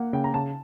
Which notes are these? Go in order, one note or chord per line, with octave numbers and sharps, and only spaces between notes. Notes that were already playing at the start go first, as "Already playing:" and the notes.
Already playing: A#3 F#5
C#3 G5
A#5
C#3 A5